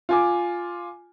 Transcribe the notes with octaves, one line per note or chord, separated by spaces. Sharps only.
F4 G#5 D6